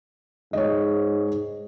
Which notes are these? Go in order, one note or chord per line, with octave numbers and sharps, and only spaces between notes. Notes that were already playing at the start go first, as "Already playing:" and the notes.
G#2 C#5 D#5